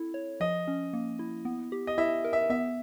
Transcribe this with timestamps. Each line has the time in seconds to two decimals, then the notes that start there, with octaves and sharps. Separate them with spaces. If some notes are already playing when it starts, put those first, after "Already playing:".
Already playing: C4 E4 A4
0.14 C#5
0.40 F3 D#5
0.68 C#4
0.93 A#3
1.19 E4
1.45 B3
1.72 G4
1.87 D#5
1.98 E4 E5
2.24 A#4
2.33 E5
2.50 B3 E5